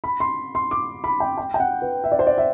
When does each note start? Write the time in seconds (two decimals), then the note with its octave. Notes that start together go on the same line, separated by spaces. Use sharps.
0.04 B5
0.20 C6
0.55 C6
0.71 D6
1.04 B5
1.20 G5
1.37 G5
1.54 G5
1.60 F#5
1.82 B4
2.04 E5
2.12 D5
2.19 C5
2.27 D5
2.38 E5